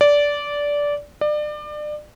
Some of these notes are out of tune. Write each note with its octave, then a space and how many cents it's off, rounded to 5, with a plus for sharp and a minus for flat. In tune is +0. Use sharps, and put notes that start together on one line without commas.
D5 -15
D5 +30